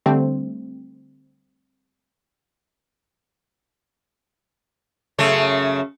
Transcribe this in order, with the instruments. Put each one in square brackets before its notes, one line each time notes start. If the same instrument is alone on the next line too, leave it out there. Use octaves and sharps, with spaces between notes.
[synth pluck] D3 G3 A3 C4
[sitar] F#2 C#3 A3